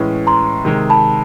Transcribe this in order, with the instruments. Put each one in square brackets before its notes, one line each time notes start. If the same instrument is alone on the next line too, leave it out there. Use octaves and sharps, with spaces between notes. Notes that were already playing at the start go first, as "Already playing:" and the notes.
Already playing: [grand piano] A2 E3 G#3 C#4
[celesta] A#5 C6
[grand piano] C3 D#3 G#3
[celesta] A5 B5